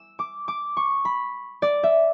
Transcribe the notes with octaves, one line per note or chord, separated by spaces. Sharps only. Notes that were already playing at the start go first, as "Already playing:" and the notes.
Already playing: E6
D6
D6
C#6
B5
D5
E5